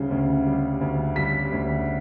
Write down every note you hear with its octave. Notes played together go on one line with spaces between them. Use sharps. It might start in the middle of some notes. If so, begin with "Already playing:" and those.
Already playing: D2 C#3 G3
D2
G3
D2
G3 B6
D2